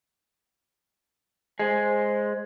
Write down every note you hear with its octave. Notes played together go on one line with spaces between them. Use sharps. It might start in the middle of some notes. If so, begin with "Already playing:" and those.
G#3 C5